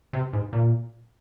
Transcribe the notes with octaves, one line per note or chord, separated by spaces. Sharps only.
C3
G#2
A#2